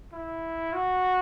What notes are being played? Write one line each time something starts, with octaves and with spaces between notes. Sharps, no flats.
E4
F#4